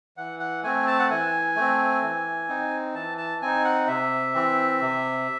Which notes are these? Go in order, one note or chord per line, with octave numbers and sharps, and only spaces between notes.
E3 F#5
F#5
A3 C4 G#5
A5
F#5
E3 G#5
A3 C4
E3
C4 D#4
E3 A5
A5
C4 D#4 G#5
F#5
C3 E5
E3 C4
C3